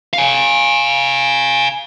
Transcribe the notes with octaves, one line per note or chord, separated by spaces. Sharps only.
F5 G#5